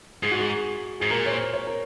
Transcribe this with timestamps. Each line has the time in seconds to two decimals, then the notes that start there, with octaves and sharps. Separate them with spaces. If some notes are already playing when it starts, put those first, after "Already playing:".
0.23 G#2 G#4
0.32 F#4
0.40 G#4
1.00 G#2 G#4
1.10 A#2 A#4
1.26 C#5
1.31 C5
1.54 C#5
1.67 A#4